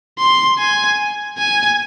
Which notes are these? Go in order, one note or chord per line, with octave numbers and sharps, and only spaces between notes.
C6
G#5
G#5